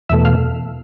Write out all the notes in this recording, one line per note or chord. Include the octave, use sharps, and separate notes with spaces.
E2 B2 A3 E5
F5